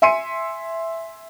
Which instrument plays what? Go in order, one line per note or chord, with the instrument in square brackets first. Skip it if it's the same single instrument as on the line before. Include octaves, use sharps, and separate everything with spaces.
[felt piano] E5 G#5 C6 C#7 D#7